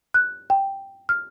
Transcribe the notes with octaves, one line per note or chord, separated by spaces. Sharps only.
F#6
G5
F6